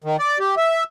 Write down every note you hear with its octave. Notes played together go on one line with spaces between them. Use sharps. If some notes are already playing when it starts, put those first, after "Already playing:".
D#3
D5
G4
E5